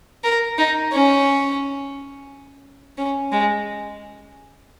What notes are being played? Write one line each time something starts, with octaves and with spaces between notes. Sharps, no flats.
A#4
D#4
C#4
C#4
G#3